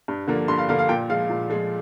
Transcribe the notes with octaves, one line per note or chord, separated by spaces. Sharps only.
G2
D3 F3 A#3
G2 C6
F5
D3 F3 A#3 F5
F5
A#2 G5
F3 G#3 F5
A#2
F3 G#3